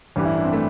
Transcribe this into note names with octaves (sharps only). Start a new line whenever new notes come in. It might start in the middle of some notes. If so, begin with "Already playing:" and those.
A1 G2 E3 G4
E4
D4
C4
A3